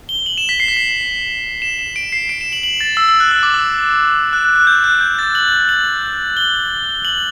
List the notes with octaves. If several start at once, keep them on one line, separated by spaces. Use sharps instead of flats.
G7
F#7
E7
B6
C7
B6
C7
E7
E7
D7
C7
D7
E7
F#7
F#7
A6
E6
E6
F#6
E6
D6
E6
F#6
F#6
F#6
G6
F#6
G6
A6
F#7
F#7
G7
F#7